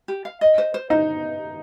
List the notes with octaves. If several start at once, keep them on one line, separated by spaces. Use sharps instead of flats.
G4
F5
D#5
C5
C5
D#4 C5